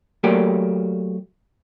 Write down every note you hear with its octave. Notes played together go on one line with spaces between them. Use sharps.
F#3 A3 A#3 F#4 G4 D5